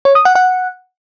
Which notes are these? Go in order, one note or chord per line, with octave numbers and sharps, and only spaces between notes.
C#5
D#6
F#5
F#5